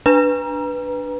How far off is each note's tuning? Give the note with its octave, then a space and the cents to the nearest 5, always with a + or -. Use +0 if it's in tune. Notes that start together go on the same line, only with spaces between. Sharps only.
D4 +0 B4 +0 A#5 +20